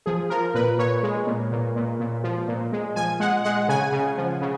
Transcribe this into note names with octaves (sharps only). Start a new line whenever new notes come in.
F3 G#4
F3 A#4
A#2 B4
A#2 C#5
G#3
A#2
A#2
A#2
A#2
F3
A#2
G#3
F3 G#5
G#3 F#5
G#3 F#5
C#3 G#5
C#3
F3
C#3